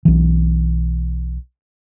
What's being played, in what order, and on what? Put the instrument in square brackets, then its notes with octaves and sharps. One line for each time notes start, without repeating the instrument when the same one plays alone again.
[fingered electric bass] B1 E3